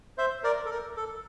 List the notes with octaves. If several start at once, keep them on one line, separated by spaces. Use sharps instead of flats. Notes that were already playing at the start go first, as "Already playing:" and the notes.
C5 E5
A#4 D5
A4
A#4
A4